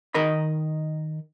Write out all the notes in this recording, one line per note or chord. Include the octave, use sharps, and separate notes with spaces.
D#3 A#4 D#5 B5